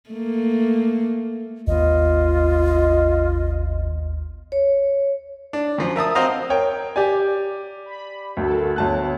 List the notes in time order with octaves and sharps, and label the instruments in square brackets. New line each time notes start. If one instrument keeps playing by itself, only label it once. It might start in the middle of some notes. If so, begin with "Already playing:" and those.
[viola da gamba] A3 A#3
[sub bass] G#1 [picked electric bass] D#2 B3 [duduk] F4 [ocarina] D#5
[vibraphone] C#5
[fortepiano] D4
F#2 F3
A#4 E5 A5 D#6
C4 F#4 C5 D#5 F5 A#5
[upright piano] A#4 C#5 G5
G4 D5 G#5
[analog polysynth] B5
[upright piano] D2 [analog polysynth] F#4 A4 A#4
[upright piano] D2 A5 F#6 [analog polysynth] B3 C#5